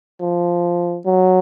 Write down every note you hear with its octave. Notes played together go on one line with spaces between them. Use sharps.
F3
F#3